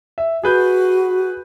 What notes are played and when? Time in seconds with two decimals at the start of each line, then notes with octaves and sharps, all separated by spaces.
0.18 E5
0.43 F#4 G#4 B4 G6